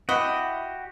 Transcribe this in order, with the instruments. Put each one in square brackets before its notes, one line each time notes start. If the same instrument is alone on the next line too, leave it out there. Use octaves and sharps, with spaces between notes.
[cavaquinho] E4 D#5 F#5 [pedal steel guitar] F#4 G4